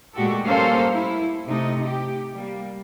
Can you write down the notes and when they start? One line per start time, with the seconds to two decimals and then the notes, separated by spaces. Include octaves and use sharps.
0.15 A#2 G#3 A3 F#4 G4 A4
0.44 G3 A#3 C#4 A4 C5 F5
0.90 E4
1.46 C3 A3 D#4
1.86 G4
2.34 G3 A#3